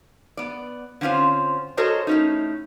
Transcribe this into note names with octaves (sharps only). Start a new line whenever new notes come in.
B3 D5
D3 C4 C#4 F4 C5
F#4 A4 A#4 C5 C#5 D#5
A2 C#4 D#4